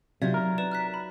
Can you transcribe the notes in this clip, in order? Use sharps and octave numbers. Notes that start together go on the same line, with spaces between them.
C3 F#3 D#4 F4 D5 E5 G#6
A#4
B4 D5 E7
F6 F#6 B6
B5